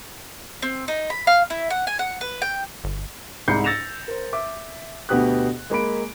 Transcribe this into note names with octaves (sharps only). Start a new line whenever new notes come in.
C4
D#4
B5
F5
E4
F#5
G#5
F#5
B4
G5
G1
C2 G#2 B5 G6 C7 C#7
E6 A6 A#6 C#7 E7 F7
A#4 C5
E5 D6
D2 B2 B3 G4 D#6 F#6
G#3 A#3 B5 D7